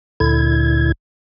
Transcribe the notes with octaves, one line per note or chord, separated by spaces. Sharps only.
D2 A#2 D3 E4 G#6